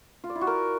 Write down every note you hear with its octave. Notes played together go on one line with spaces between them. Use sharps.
F4
D5
E4
F#4
A#4